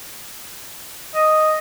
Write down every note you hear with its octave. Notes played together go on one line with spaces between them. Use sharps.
D#5